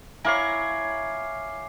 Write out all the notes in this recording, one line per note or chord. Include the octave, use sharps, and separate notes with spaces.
E4 C#5 F5 G#5 A#5 D6 C7